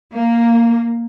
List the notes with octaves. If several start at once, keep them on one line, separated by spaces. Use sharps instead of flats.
A#3